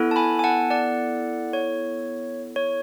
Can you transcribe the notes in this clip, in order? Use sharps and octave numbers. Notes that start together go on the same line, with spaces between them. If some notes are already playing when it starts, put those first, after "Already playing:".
Already playing: B3 E4 A4
A5
G#5 B5
G#5
F#5 A5
D5 F#5
C#5
C#5